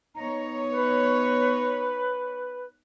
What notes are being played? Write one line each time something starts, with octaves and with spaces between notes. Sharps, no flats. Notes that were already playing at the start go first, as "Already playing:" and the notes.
B3 D#4 C#5 A#5
B4